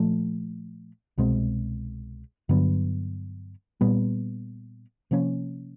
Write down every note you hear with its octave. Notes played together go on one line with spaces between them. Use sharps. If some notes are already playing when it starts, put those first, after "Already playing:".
Already playing: A#2 F3 A3
C2 B2 G#3 C4
G2 D3 F#3 B3
A#2 G3 B3
C3 F3 A#3 C#4